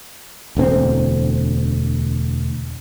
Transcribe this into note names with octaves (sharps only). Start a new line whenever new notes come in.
E1 D2 B3 C4